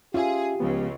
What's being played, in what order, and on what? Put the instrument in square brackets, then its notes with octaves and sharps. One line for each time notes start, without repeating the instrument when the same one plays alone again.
[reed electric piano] C#4 E5 G#5 [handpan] F4 [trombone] G4 [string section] G#4
[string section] C#2 C#3 [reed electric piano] F3 G#3 B3